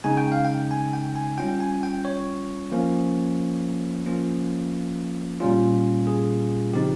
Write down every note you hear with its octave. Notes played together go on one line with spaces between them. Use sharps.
C#3 G#3 D#4 G#5
G5
F5
G5
G#5
G5
G#5
G3 C#4 F4 G5
G#5
G5
C#5
F3 A#3 C#4
F3 A#3 C#4 F4
A#2 G3 C#4 F4
G#4
C#3 F3 C4 D#4 G4